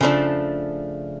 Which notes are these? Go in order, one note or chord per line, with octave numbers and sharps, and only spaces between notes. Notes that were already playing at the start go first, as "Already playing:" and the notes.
C#3 F3 A3 D4